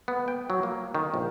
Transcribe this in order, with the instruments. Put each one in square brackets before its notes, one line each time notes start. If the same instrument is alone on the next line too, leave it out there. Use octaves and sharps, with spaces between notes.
[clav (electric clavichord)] B3
G5
F#3
A#3
D#3
A#1